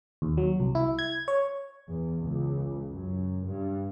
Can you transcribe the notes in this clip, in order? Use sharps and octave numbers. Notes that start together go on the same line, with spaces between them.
D#2
F#3
C2
E4
G#6
C#5
E2
C#2
F#2
G2